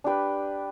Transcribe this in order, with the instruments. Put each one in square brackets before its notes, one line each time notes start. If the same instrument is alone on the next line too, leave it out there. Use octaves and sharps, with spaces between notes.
[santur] D4 G4 B4